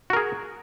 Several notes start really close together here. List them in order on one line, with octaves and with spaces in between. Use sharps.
F#4 A#4 G#4